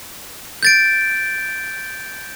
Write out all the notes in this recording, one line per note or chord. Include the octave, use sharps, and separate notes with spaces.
G6 A6 D7